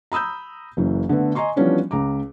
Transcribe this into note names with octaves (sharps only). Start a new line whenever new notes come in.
A#5 B5 D#6 E6 G6
F#1 F#2 E3
D3 A3 B3
D#5 G#5 A#5 C6 C#6
E3 F3 G3 B3 C#4 D4
C#2 A#5 D6